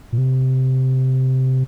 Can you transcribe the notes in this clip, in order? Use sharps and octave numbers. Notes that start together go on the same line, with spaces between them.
A#2
C3